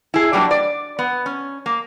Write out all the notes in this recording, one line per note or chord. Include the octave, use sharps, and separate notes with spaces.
E4 G#4
F#3 G3 A#3 D4
D5
B3
C#4
A#3